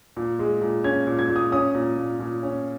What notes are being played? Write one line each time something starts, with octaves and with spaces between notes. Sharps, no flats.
A#2
G#3
A#2
C#4 G#6
A#2
G#6
A#2
D#6
C#4 D#6
A#2
A#2
A#2
C#4